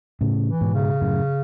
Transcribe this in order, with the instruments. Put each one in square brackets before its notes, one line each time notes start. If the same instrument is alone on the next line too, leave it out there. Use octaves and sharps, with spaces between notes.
[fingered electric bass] A2 C#3
[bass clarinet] E3
[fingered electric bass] G#2 B2
[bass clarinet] C#3
[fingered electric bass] F#2 A2